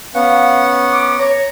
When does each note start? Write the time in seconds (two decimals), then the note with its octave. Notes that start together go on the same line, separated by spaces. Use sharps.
0.14 B3 C#4 F5 F#5
0.92 D6
1.19 C#5 A#5